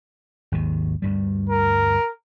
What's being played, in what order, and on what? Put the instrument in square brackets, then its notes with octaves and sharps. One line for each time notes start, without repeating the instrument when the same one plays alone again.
[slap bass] G#1 D#2 D#3
D2 G2 G3
[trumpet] A#4